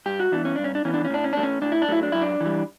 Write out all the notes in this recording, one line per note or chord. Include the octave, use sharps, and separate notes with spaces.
G2 G4
F#4
E3 B3 D4
C#4
G2 D4
C#4
D4
E3 B3 C#4
D4
C#4
A2 D4
C#4
F#3 A3 D4
C#4
A2 D4
E4
D4
F#3 A3 E4
D4
F#2 E4
D4
E3 G3